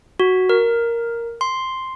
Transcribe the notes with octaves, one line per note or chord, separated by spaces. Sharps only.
F#4
A#4
C6